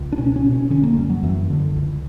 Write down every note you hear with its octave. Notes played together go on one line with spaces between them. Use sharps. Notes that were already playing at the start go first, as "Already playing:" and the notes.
Already playing: C#2
D4
B2 C#4
C#4
B2
C#4
D3 C#4
A#3
F#2 G3
F#3
F#2 E3
D3
C#2